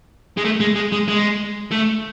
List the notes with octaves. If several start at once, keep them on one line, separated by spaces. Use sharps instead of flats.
G#3
A3
G#3
G#3
G#3
G#3
A3